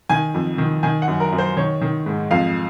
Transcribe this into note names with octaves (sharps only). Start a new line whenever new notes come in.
D#3 G#5
F2
D#3
D#3 G#5
F#5
F#2
A#4
F#2
C5
D#3 C#5
D#3
G#2
F2 F5